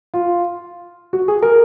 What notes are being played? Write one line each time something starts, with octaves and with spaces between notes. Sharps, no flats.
F4
F#4
G#4
A#4